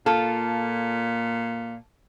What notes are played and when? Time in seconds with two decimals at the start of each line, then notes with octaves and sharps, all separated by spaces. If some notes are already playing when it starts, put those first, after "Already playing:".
0.06 A#2 F4 A4